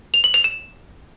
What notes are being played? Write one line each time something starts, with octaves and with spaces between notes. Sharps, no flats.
F7
F#7
F7
E7